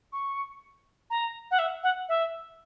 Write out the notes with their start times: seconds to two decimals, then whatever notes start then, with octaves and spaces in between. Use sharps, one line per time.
0.12 C#6
1.10 A#5
1.51 F#5
1.59 E5
1.83 F#5
2.09 E5